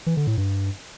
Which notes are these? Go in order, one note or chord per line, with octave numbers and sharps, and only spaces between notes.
E3
D3
A2
G2